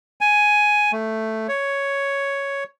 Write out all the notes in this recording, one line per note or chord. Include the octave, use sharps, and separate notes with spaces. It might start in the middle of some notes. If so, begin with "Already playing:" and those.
G#5
A3
C#5